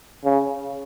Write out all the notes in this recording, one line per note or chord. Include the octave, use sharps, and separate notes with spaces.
C#3